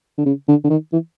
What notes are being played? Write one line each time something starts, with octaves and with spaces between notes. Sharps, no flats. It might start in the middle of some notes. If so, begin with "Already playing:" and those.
D3
C#3
D3
D3
D#3
E3